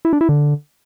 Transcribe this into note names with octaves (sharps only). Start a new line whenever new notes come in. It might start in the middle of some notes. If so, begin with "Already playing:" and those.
E4
D4
E4
D3